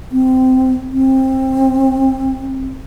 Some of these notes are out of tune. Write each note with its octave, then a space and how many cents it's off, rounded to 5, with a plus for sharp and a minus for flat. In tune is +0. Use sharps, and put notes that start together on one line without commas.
C4 -15
C4 +20